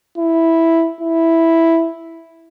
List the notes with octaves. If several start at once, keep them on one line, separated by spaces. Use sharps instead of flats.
E4
E4